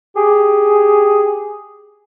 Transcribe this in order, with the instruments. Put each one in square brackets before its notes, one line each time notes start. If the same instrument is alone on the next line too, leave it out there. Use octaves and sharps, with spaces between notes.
[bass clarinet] G4 [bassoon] G#4